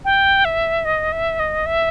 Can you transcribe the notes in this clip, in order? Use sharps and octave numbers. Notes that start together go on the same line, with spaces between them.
G5
E5
D#5
E5
D#5
E5